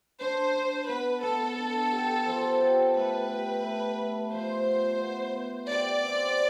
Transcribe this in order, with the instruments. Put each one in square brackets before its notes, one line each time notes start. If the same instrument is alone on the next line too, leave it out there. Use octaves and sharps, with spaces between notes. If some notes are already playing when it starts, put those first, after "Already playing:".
[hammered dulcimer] D4 [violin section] C5
[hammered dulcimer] D4
[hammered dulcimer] B3 [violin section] B4
[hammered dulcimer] B3 [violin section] A4
[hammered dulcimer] D4
G4
F3
G4
[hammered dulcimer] A3 [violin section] B4
[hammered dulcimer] G4
A3
A3
[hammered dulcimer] F3 [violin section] C5
[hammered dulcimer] B3
B3
B3
[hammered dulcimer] G4 [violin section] D5
[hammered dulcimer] C4